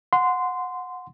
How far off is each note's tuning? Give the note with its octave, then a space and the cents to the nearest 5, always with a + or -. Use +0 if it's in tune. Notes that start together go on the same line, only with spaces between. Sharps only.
F#5 -20 C6 -15